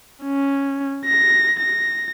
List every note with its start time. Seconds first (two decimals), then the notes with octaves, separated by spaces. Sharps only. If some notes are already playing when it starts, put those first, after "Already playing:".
0.23 C#4
1.05 A#6
1.60 A#6